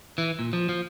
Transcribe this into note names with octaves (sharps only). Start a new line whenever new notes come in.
E3
A#2
F3
F3